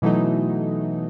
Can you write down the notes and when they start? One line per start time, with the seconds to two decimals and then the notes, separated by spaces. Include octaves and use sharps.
0.02 B2 E3 F#3 A3 D#4